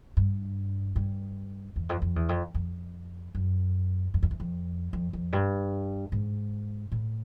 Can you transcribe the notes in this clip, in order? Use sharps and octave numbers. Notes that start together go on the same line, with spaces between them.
G2
G2
E2
F2
F2
E2
F2
F2
F#2
F#2
F2
E2
F2
F2
F2
G2
G#2
A2